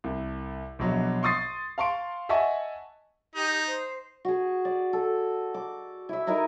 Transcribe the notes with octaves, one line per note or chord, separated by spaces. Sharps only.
C2
A#1 B2 F#3
C6 C#6 D#6 A6 C7
F5 A5 C6 C#6 D7
D#5 E5 F#5 G#5 A5 C#6
D#4 G4 G6
C5
F#4 G#4
D5
A4
D6
E4 E5
D#4 E4 A#4 G#5